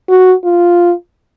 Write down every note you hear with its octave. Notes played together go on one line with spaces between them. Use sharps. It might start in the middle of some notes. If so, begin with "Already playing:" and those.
F#4
F4